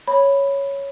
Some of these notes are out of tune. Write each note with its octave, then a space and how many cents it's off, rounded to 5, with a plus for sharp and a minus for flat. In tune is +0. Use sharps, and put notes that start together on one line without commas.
C#5 +0 B5 +0